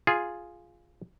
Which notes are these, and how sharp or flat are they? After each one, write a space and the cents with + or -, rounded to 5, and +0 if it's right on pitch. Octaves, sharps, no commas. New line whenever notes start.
F4 +0 G#4 +0